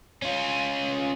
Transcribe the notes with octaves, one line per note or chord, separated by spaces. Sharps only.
C#4 F4